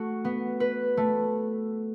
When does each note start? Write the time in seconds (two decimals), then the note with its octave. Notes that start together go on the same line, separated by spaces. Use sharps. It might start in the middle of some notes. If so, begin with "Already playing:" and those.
Already playing: A3 F#4
0.25 B3
0.60 B4
0.97 A3